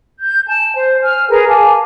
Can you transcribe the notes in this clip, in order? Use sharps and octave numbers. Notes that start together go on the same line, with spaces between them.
G6
G#5 A5
C5
G#5 F6
G#4 A#4 B4 A#5
F5 G#5 A5 D6